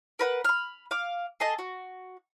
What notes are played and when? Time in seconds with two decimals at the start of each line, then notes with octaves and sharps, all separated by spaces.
0.19 A#4 B4 F#5
0.45 B5 F6
0.91 F5 D6
1.40 G#4 A4 D#5 A5
1.59 F#4